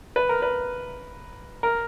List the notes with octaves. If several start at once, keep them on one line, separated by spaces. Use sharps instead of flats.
B4
A#4
B4
A#4